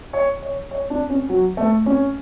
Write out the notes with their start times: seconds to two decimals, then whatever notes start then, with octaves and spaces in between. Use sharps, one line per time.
0.13 C#5
0.42 C#5
0.71 C#5
0.90 D4
1.10 C#4
1.29 F#3
1.57 A3
1.86 C#4